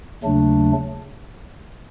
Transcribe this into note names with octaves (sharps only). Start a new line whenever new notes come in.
D#2 C#3 F#3 A3 D4